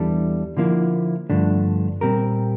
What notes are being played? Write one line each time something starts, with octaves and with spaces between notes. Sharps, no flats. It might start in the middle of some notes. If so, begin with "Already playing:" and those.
Already playing: E2 E3 G3 D4 A4
D3 F3 A#3 E4
G2 D3 F3 A3 D4
A#2 G3 C4 G4 A#4